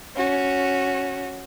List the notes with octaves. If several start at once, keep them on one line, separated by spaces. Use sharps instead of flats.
C#4 F#4